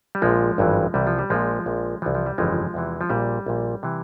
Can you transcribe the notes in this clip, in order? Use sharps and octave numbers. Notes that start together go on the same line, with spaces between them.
G3
A#1 A#2 F3 G#3
G#1 G2 E3
C2 C3 E3 G3
F3
G3
A#1 A#2 F3 G#3
A#1 A#2
C2 C3 E3 F3
F3
G3
G1 F2 C#3 E3 F3 G#3
E2 C3 E3
F3
A#1 A#2 G3
A#1 A#2
C3 E3